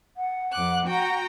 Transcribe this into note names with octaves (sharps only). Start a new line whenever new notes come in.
F#5
F2 D6 F#6
F#4 G5 A#5